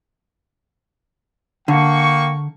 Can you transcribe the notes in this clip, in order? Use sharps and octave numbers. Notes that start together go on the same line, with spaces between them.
D3 A#3 G5 C#6